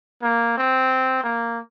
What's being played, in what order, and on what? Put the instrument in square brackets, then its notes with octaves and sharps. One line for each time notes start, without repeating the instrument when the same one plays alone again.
[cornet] A#3
C4
A#3